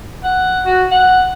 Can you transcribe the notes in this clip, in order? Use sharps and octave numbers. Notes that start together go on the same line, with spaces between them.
F#5
F#4
F#5